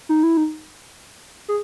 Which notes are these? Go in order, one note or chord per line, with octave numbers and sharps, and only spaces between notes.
D#4
E4
D#4
G#4